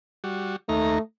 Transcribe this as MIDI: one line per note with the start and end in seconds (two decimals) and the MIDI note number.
0.24 0.56 55
0.24 0.56 66
0.69 0.98 39
0.69 1.00 57
0.69 0.98 63
0.69 0.98 82